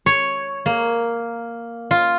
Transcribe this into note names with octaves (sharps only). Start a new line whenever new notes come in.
C#5
A#3
F4